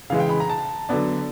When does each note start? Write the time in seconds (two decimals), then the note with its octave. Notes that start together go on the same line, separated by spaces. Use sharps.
0.10 C#3 E3 G#3 F5
0.20 G5
0.30 B5
0.40 A#5
0.49 A5
0.89 D3 F#3 B3 D4